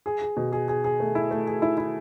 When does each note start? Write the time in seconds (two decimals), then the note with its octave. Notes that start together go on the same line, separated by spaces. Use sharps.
0.06 G#4
0.22 G#4
0.37 B2
0.52 G#4
0.68 G#4
0.84 G#4
1.00 A3
1.15 E4
1.31 A3
1.47 G#4
1.62 E4
1.78 E4